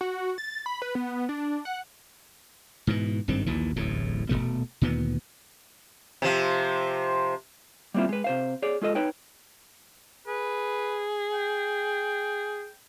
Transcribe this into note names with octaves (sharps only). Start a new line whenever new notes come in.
F#4
A6
B5
B4
B3
D4
F#5
G#2 B2 E3
G#1 G2 D#3 C4
A#1 D#2 A#2 E3
D1 A1 E2 A2
D#1 D#2 B2 A3
D2 A#2 D#3 B3
C3 F3
G3 A#3 C4 E4 F4
G#3 B4
C3 C5 F5
G#4 C#5 D5
G#3 F4 A4 D#5
D#4 B4 C#5 G5
G#4 B4
G5